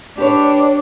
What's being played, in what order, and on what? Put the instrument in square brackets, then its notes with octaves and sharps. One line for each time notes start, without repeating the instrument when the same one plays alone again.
[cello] D4 [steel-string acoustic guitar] G4 B4 C#5